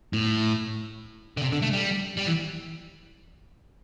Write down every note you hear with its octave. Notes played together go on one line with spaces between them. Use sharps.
A2
D3
C3
D3
A3
G3
G3
E3